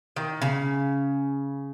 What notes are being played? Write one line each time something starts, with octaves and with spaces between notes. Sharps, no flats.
D#3
C#3